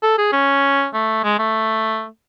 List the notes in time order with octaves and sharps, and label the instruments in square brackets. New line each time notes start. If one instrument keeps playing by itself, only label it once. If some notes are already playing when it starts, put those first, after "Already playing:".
[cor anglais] A4
G#4
C#4
A3
G#3
A3